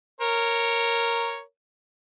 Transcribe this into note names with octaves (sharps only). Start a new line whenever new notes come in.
A#4 C#5